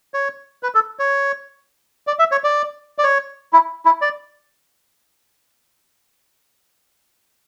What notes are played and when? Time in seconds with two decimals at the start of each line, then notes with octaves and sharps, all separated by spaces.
0.14 C#5
0.63 B4
0.75 A4
0.99 C#5
2.07 D5
2.19 E5
2.32 C#5
2.44 D5
2.98 D5
3.04 C#5
3.53 E4
3.86 E4
4.02 D5